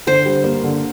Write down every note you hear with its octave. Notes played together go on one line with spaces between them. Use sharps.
D3 C5
G3
A#3
D3